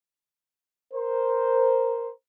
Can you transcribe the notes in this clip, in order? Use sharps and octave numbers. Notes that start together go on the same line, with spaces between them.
A#4 C5